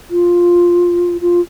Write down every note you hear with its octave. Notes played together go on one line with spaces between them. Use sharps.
F4
F4